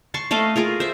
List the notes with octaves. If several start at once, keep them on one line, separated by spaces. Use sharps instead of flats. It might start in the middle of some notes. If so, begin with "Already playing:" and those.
A5 C6 C#6
A3 A4 D#5 F5
F4 G#4 A#4
C5 E5